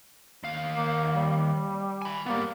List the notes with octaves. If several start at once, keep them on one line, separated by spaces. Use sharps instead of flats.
D#2 F5
A#3
G3
G#5 B5
G3 A#3 B3